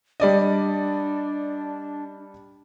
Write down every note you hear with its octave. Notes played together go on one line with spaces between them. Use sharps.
G3 D4 D5 D#5